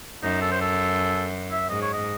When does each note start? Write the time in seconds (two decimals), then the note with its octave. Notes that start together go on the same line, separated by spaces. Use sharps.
0.23 F#2 D#4
0.41 A4
0.51 C5
0.61 A4
1.51 E5
1.69 G#2 D#5
1.82 C#5
1.93 D#5